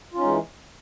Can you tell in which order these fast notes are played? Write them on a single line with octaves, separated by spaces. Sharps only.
F4 C#4 D#4 G#3 E3